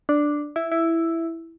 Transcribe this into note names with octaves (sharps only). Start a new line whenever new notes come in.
D4
E4
E4